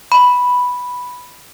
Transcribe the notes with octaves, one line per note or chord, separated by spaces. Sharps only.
B5